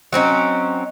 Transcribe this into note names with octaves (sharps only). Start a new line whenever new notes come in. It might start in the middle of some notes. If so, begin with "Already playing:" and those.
F#3 C4 C#4 D#4